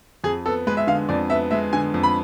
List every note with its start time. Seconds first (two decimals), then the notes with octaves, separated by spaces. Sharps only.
0.24 F2 G#4
0.46 B3 A4
0.67 G#3 B4
0.77 E5
0.87 D3 F5
1.09 F2 D5
1.30 B3 E5
1.51 G#3 E5
1.73 D3 G#5
1.94 F2
2.03 B5